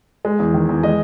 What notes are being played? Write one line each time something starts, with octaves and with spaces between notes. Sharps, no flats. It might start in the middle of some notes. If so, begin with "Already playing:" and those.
G#3
E2
D#3
E2
G#3 D#5